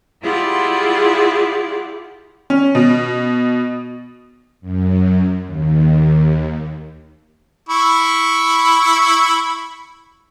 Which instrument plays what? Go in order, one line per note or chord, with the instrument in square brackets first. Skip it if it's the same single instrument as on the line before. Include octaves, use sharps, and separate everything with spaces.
[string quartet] E4 F4 G4 G#4 D5 F#5
[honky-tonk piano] C#4
B2
[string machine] F#2
D#2
[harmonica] E4 B5 C#6